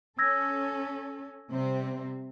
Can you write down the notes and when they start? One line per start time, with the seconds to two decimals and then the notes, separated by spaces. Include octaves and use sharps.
0.19 C#4 A4 E6 G#6 A#6
1.50 C3 G3 C4